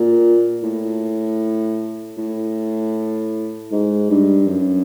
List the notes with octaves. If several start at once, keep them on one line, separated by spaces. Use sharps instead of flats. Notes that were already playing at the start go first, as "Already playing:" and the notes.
Already playing: A#2
A2
A2
G#2
G2
F#2